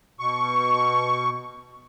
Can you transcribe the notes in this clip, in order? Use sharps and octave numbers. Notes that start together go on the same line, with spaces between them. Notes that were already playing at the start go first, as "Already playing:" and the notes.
B2 C#6